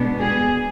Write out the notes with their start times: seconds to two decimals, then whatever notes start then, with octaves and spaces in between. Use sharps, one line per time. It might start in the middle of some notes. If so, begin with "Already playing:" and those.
Already playing: B2 G#3 B3 D4
0.20 G#4